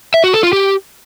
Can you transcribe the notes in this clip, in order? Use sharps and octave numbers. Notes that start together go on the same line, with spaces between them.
E5
F#4
A4
F4
G4